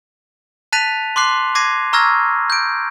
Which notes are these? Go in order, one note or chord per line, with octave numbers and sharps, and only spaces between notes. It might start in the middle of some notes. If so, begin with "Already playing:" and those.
A5 F#6 A6 B6 D#7 F7
C6 D6 F#6 C7
D6 G#6 A#6 C7 D#7
A#5 C#6 E6 F6 G#6 A#6
G6 D7